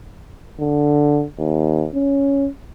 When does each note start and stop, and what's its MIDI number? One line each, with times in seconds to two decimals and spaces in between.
0.60 1.24 50
1.39 1.87 39
1.95 2.49 61